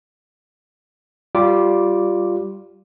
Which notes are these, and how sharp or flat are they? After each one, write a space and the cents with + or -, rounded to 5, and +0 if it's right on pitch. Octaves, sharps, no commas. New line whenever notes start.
G3 -10 F4 +0 D6 +0